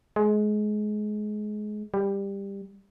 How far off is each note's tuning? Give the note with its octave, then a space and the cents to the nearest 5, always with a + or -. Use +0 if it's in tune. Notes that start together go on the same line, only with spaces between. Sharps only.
G#3 +25
G3 +15